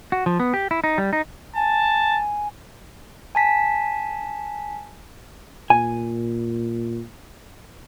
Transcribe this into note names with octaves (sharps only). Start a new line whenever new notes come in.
F#4
F3
B3
G4
E4
D#4
G3
D#4
G#5 A5
G#5 A5 B6
A#2 G#5